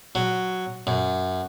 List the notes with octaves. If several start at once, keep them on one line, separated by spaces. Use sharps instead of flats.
F#3
F#2